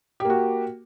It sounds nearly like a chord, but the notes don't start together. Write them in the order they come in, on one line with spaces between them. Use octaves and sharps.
G4 A#3 F#4